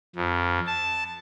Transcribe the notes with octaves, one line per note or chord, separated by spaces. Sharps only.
F2
A5